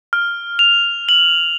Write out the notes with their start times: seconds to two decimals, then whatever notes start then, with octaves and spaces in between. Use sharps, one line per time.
0.13 F6
0.59 F7
1.09 F#7